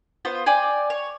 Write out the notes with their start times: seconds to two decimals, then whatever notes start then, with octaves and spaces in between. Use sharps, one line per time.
0.25 B3 F4 C5
0.46 D5 G5 G#5
0.90 C#5